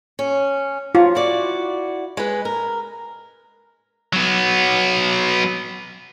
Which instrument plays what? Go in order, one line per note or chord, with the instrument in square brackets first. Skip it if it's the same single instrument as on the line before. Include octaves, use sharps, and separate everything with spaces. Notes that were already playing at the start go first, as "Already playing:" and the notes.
[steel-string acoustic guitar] C#4
[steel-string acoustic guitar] F#3 [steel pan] F4
[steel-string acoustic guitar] E4 F#4 D5
G#3 B4
A#4
[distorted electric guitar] F#3 B3